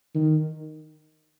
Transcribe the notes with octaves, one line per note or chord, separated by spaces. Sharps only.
D#3